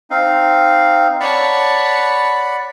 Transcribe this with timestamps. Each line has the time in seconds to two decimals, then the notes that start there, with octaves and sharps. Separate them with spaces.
0.10 C4 D#4 F5
1.20 C#5 D5 F#5 A5 B5